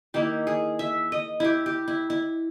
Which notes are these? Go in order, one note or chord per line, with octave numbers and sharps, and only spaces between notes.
D#3 A#3 E4 G4
G#4
E5
D#5
E4 G4
G4
E4
E4